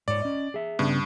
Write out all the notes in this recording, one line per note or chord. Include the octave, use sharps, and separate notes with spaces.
G#2 C#5 D5
C#4 D#5
G#4 E5
G2 C#3 B3